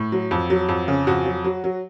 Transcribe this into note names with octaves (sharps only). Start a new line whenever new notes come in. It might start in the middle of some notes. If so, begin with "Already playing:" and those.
Already playing: A2
F#3
F2
F#3
F2
C#3
F2 F#4
F#3
F#3
F#3